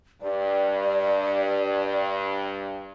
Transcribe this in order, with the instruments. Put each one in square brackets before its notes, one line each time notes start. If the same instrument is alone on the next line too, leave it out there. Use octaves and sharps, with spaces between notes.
[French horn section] G2 [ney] D5